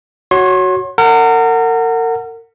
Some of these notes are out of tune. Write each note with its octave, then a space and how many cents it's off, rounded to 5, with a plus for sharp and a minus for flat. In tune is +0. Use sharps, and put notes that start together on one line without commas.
F#4 +5 C#5 +0 C6 +35
A#4 -35 F#5 +0